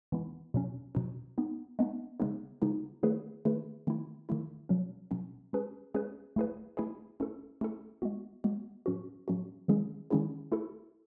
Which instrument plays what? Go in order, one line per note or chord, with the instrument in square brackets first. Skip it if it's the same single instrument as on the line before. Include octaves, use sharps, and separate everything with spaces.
[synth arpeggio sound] E3 G#3 B3 E4
B2 F#3 C#4
B2 F#3 C#4
G#3 B3 D#4
G#3 B3 D#4
C#3 G#3 B3 D#4
C#3 G#3 B3 D#4
D#3 A3 E4 G#4 B4
D#3 A3 E4 G#4 B4
D#3 A3 E4
D#3 A3 E4
B2 F#3 C#4
B2 F#3 C#4
G#3 C#4 G#4 B4
G#3 C#4 G#4 B4
A3 E4 G#4 B4
A3 E4 G#4 B4
A3 C#4 E4 A4
A3 C#4 E4 A4
G#3 B3 F#4
G#3 B3 F#4
A2 F#3 C#4 F#4
A2 F#3 C#4 F#4
D#3 G#3 C#4 E4 G#4
D#3 G#3 C#4 E4 G#4
A3 E4 A4